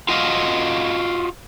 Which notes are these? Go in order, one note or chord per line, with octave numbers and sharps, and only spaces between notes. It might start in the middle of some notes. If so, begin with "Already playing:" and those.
F4 F#4 D#5 F5